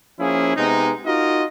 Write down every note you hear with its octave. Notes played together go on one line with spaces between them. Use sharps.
F3 A#3 C#4 E4 G#4
C3 G#3 B3 D#4
D#4 F4 F#4 A#4 D#5